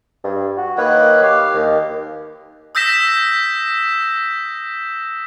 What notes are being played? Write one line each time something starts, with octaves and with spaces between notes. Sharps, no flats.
G2
F#4
D#3 A#3 B4 C#5
G4 F5
D#2
D#6 E6 G6 A#6 B6 E7